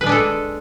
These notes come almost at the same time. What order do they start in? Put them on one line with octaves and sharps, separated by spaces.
B4 G#3 D4 G#4 A4